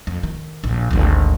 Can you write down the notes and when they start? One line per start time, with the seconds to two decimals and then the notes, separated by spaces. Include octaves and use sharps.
0.07 F2
0.23 D#3
0.64 A#1 D#2
0.91 G#1 D2